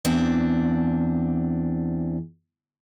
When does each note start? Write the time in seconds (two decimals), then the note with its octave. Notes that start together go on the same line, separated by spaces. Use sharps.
0.05 E2 C4 D4